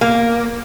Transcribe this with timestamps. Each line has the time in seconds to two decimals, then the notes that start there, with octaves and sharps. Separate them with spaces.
0.01 A#3